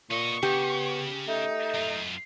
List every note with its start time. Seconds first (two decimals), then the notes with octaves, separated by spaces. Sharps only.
0.11 A#2 B3 D#5 C#6
0.43 C#3 B3 G4
1.28 A3 D#4
1.74 F#2 F4